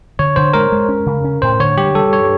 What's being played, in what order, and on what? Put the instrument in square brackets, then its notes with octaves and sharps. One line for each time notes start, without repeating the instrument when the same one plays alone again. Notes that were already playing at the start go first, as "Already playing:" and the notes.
[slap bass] D3 [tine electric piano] C#5
[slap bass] D3 [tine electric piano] C5
[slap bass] G#3 [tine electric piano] A#4
[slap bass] G#3
C#4
C#3
C#4
[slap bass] A2 [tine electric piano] C5
[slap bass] D3 [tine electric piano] C#5
[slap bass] G3 [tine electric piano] G4
[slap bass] G3 [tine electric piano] A4
[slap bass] G2 [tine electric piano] C#5